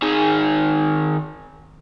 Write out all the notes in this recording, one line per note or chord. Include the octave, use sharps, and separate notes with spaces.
D#3 G#4